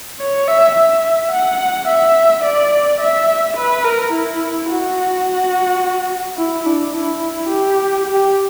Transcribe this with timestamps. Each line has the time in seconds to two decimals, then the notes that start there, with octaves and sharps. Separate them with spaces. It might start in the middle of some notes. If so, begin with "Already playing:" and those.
0.20 C#5
0.48 E5
0.75 E5
1.32 F#5
1.88 E5
2.44 D5
3.00 E5
3.57 B4
3.84 A#4
4.12 E4
4.69 F#4
6.38 E4
6.66 D4
6.94 E4
7.49 G4
8.06 G4